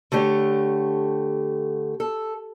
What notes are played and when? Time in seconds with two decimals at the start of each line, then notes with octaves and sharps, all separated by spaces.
0.12 D3 A3 G4 C#5
2.00 A4